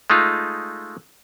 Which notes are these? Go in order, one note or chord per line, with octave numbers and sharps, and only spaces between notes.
G#3 A3 D#4 F4